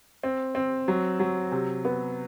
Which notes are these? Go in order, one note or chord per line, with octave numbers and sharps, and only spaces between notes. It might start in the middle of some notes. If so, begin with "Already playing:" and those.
C4
C4
F#3
F#3
C3
B3